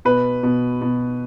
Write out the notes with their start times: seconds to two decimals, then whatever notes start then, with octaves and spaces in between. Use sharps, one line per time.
0.05 B2 B4
0.43 B2
0.81 B2